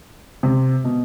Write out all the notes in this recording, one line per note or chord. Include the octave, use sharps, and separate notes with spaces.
C3
B2